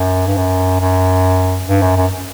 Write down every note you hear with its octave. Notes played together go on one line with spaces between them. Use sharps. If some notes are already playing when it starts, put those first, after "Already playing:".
Already playing: F#2
G2
F#2
F#2
G2
F#2
F#2